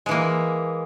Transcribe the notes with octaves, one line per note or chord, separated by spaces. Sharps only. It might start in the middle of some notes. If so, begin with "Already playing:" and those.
E3 G#3 A#3